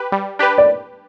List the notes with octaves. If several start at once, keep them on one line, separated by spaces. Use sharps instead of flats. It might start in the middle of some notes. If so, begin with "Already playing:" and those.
Already playing: G4 B4
G3
D4 G4 B4
D5